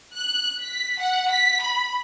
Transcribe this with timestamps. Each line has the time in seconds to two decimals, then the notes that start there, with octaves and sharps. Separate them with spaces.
0.17 F#6
0.62 B6
1.00 F#5
1.31 B6
1.62 B5